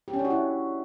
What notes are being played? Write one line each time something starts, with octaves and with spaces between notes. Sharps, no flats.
G4
C#4
D4
F#4
E4